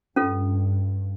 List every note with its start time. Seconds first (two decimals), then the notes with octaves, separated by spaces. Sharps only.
0.16 G2 C#4 F4 A4